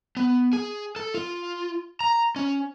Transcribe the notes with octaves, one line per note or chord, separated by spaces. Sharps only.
B3
G#4
A4
F4
A#5
C#4